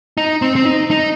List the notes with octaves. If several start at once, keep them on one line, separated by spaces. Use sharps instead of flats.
D#4
C4
C4
D#4
D#4